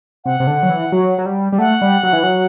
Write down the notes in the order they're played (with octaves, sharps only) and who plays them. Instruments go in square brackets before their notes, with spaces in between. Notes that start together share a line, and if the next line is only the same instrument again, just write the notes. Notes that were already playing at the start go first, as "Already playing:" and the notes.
[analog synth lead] C3 [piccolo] F#5
[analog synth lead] C3
D3
F#3
E3
F#3
F#3
G3
G3
[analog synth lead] A3 [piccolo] F#5
[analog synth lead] G3
F#3
E3
F#3